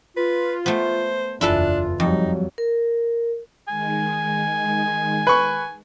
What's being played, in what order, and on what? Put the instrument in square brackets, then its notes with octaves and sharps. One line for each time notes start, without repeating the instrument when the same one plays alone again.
[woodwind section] F4 [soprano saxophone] B4
[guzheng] A3 B3 [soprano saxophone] C5
[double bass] F#1 E2 [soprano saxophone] D4 [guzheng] E4 A4 B4 [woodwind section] F4
[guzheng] F2 [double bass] F#3 G3 [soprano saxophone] D#4
[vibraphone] A#4
[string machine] D#3 G#3 [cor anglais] G#5
[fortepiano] B4 C#6